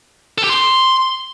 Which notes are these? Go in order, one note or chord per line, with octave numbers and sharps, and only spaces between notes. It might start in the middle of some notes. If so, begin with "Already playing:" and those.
A4
G4
C6